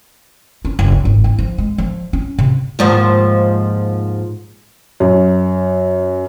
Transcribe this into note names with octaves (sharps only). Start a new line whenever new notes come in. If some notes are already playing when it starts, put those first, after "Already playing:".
C#4
F#1
C#2
G#1
E4
F3
G#3
F3
C#4
C3
D#2 G#2 F3
F#2